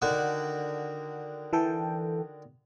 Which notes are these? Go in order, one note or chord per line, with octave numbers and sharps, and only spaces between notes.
D3 D#3 F#4
E3 A4 G5